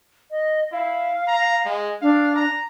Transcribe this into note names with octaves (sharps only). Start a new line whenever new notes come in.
D#5
E4 F5
A#5
G#3
D4 F5
A#5